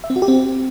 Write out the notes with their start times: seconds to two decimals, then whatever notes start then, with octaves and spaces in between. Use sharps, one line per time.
0.04 E5
0.10 C4
0.16 F#4
0.22 G4
0.28 C4